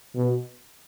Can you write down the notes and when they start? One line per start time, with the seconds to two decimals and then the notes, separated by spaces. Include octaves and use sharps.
0.15 B2